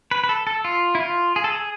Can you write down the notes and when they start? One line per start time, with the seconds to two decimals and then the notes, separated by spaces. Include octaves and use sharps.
0.11 B4
0.24 B4
0.29 A4
0.47 A4
0.65 F4
0.95 E4
1.00 F4
1.36 G#4
1.44 A4
1.52 G#4